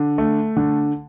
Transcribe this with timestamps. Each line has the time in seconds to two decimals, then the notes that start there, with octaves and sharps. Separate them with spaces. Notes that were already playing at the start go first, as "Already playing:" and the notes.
Already playing: D3
0.18 A3
0.57 D3